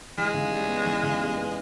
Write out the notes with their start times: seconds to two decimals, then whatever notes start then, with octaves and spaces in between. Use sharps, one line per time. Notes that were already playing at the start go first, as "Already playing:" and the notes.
0.17 E3 G#3
0.34 C#3
0.52 G3
0.68 B3
0.85 E3
1.03 C#3
1.21 G3
1.37 B3